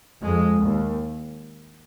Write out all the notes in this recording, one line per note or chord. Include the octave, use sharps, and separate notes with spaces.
F2 G#3
D#2